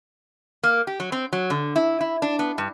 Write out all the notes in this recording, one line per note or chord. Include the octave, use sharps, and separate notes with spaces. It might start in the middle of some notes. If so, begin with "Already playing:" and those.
A#3
G4
F#3
C4
F#3
D3
E4
E4
D4
B3
G2